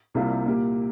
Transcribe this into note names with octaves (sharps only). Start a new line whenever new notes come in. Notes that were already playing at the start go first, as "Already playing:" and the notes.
C2 C3 G3 A#3 F4
A#2 A#3 G4